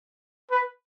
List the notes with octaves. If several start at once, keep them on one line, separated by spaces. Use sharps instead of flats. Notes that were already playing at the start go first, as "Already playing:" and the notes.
B4